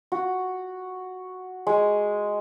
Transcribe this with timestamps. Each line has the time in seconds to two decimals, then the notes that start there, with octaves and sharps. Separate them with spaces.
0.12 F#4
1.67 G#3